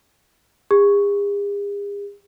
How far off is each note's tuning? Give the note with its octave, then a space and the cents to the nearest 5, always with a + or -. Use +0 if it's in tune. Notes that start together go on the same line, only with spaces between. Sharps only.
G#4 -45